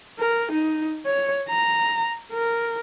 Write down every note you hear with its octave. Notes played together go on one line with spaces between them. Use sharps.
A#4
D#4
C#5
A#5
A#4